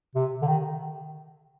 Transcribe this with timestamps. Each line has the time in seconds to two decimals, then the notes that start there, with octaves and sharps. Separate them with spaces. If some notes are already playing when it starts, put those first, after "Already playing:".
0.15 C3
0.42 D3
0.47 D#3